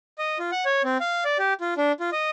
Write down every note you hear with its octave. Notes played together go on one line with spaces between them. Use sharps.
D#5
F4
F#5
C#5
C4
F5
D5
G4
F4
D4
F4
D#5